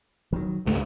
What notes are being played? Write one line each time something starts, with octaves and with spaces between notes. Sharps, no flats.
D#3 F#3
C#2 G2 A3